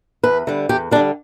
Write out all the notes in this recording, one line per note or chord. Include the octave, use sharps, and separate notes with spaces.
E2 B4
D3 G3
E2 G4
D3 G3 D4